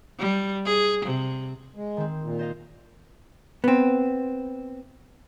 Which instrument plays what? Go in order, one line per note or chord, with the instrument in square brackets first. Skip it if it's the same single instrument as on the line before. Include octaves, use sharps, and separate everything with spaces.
[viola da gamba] G3
G#4
C3
[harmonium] G#3
[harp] D#3 C4
[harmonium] A#2
[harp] C5 D#5 F5
[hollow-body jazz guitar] B3 C4